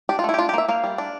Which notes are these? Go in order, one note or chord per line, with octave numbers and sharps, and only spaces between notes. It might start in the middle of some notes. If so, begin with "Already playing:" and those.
D4 G4
F4
A3 E4
G4
D4 F4
G4
A#3 E5
A#3 F5
G3
D4